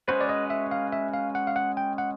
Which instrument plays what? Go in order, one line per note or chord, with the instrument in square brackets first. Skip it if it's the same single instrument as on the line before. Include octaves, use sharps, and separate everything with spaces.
[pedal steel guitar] G#3 C#4 F#4 B4 [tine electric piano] C5
[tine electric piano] D5
D#5
E5
F5
E5
F5
F#5
F5
F#5
G5
F#5